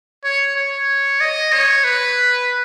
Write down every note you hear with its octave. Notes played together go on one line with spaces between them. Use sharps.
C#5
C#5
D#5
C#5
B4